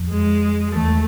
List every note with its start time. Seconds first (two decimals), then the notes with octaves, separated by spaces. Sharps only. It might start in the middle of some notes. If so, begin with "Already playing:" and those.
Already playing: F2
0.10 G#3
0.75 E2 A3